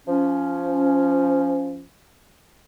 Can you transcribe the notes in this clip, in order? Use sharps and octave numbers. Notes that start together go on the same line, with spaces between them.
F3 C#4